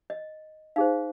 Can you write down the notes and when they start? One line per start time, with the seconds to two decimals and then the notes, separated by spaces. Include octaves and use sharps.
0.10 D#5
0.76 D#4 G#4 C5 F5